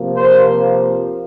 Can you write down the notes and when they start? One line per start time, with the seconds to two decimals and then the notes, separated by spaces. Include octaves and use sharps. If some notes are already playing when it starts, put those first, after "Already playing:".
Already playing: C3 F3 A#3
0.17 C5